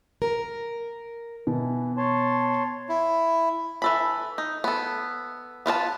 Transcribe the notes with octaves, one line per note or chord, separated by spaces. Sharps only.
A#4
B2 E3
C#5 A5 C6
E4
E3 A4 B5
D#4
B3 A4
B3 F4 C5 A5